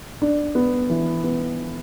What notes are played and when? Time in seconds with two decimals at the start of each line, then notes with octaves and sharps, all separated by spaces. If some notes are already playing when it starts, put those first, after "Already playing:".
0.22 D4
0.55 B3
0.90 E3
1.24 B3